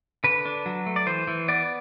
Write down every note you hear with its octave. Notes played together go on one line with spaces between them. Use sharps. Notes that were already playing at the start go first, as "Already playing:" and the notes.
D3 B4
D4
F#3
A3
D5
E3 C5
E3
B3 D5